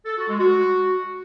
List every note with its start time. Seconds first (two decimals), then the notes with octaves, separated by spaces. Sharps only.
0.06 A4
0.17 F#4
0.28 G#3
0.39 F#4